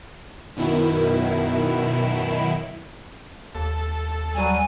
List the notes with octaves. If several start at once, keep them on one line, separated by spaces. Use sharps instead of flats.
F#2 B2 D#3 E4
D#2 A4
F#3 G3 G#5